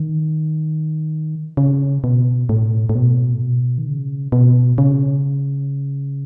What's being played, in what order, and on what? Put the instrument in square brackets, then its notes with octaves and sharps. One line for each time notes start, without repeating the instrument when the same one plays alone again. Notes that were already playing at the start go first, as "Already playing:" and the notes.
Already playing: [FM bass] D#3
C#3
B2
A2
A2
B2
A2
B2
D#3
C#3
B2
C#3